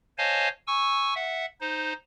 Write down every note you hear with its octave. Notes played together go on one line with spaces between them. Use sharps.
C5 C#5 D#5 F5 G#5 A5
G#5 C#6 E6
E5 F#5
D#4 C5